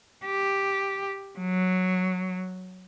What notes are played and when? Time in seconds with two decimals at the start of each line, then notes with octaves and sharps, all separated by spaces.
0.25 G4
1.39 F#3